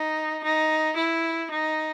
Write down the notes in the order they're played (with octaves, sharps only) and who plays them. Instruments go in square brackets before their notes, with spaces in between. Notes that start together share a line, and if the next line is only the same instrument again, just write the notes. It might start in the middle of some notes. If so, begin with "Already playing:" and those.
Already playing: [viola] D#4
D#4
E4
D#4